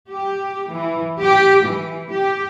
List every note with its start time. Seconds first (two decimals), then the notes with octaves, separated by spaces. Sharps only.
0.11 G4
0.69 E3
1.19 G4
1.64 E3
2.11 G4